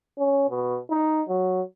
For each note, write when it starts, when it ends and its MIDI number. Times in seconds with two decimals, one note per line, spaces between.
0.18 0.48 61
0.50 0.78 47
0.90 1.22 63
1.29 1.62 54